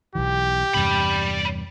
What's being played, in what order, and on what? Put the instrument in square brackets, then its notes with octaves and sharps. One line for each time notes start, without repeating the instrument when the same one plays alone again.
[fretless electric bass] B1 E3 [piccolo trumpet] G4
[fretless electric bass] E2 G2 C3 [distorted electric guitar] D5 B5